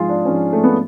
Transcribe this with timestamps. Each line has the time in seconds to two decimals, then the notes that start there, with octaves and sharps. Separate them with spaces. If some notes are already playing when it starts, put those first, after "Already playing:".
Already playing: G#2 F3 G#3 F4 G#4
0.09 D4
0.25 G#2 F3 G#3 C#4
0.53 A3
0.64 B3